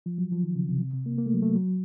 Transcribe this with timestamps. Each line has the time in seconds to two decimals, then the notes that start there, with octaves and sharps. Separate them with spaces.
0.06 F3
0.18 F#3
0.32 F3
0.43 D#3
0.56 C#3
0.69 C3
0.81 C3
0.93 C3
1.06 A#3
1.18 A#3
1.26 A3
1.34 F#3
1.42 A3
1.55 F#3